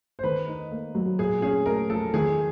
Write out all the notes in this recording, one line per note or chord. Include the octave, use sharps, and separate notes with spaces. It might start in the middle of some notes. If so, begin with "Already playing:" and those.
C5
D#3 B4
D#4
A#3
F#3
A#2 G#4
C#4 G#4
A3 A#4
F3 A4
D#3 G#4